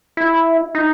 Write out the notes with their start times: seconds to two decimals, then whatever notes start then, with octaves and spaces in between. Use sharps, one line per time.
0.17 E4
0.75 D#4